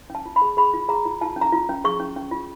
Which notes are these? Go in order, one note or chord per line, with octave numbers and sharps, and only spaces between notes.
C#4 A5
F4
B5
G#4
G#4 B5
F4
G#4 A#5
F4
F4 A5
C#4
A#5
F4
C#4
G#4 C#6
C#4
C#4
F4